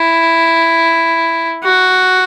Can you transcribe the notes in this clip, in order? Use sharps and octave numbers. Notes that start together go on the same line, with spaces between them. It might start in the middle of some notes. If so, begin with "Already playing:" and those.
Already playing: E4
F#4